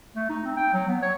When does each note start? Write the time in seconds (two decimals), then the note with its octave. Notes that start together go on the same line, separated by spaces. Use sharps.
0.16 A3
0.30 D#4
0.45 C4
0.57 G5
0.74 F#3
0.88 B3
1.02 C#5